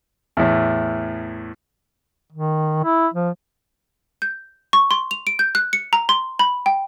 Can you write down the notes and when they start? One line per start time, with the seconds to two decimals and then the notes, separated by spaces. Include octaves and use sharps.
0.37 E2 A2
2.33 D#3
2.84 E4
3.14 F3
4.22 G6
4.73 C#6
4.91 C6
5.11 F7
5.27 D7
5.39 G6
5.55 F#6
5.73 C#7
5.93 A#5
6.09 C6
6.39 B5
6.66 G5